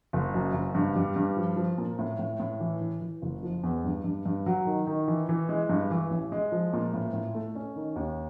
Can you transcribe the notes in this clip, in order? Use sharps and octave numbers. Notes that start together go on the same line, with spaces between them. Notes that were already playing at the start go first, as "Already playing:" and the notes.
F#1
F#2
F#1
G2
G3
G2
F3
F3
A#2
A2
A2
A2
E3
E3
E3
F#1
F3
E2
G2
G2
G2
F#3
D#3
D#3
E3
E3
G#3
G2
E3
A1
G#3
F3
A#2
A2
A2
A3
C#4
D#3
D#2